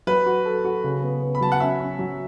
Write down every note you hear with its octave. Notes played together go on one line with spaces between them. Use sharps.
F#3 B4
F#4
A4
F#4
C#3
B3
B3
B5
F#3 A5
F#5
C#4 E5
C#4
F#3